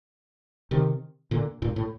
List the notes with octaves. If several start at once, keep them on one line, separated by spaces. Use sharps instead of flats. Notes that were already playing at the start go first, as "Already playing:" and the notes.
C3 D#3
A#2 D3
G2 A#2
A2